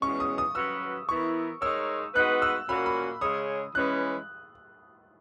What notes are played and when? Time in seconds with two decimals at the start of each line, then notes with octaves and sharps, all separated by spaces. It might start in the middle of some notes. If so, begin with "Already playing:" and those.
0.02 E2 B2 G#3 C#4 C#6
0.20 D#6
0.38 D#6
0.55 F#3 C#4 F#4 B4 E6
1.08 E3 B3 E4 A#4 C#6
1.62 G#3 D#4 A#4 C#5 E6
2.15 G#3 B3 D#4 F#4 B4 F#6
2.42 E6
2.68 A#2 A#3 C#4 F#4 B5
2.86 B5
3.21 C#3 G#3 C#4 G#4 C#5 D#6
3.75 E3 G#3 C#4 E4 B4 F#6